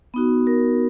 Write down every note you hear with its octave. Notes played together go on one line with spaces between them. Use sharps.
B3 D#4 F#4
A#4